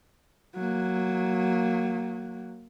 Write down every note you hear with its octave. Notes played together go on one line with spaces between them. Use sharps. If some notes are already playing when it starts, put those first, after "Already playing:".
F#3 A#3